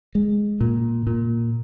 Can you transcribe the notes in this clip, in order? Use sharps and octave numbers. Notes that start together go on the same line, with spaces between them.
G#3
A#2
A#2